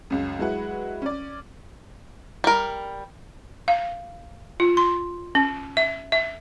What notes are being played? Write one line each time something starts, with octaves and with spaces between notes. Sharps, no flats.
C#2 F#2
F#3 G#3 E4 B4 F#5
C#4 D5
G3 A#4
F5
F4
C6
C#4
E5
E5